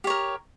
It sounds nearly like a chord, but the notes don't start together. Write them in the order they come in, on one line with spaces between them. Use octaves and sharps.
G4 C#5 A#4